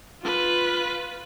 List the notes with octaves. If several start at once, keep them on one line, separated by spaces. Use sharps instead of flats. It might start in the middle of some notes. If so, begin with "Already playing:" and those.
F4 B4